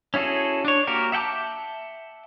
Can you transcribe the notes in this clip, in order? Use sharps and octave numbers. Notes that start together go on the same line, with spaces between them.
C#4 E4 F#4 G#4 A4
D4 C#5
A#3 F#4 G4 A#4
E5 F#5 G5 A5 D6